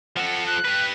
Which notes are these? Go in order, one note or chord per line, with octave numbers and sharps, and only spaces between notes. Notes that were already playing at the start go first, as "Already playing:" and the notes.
F3 A4 F#5
F#6
G4 B4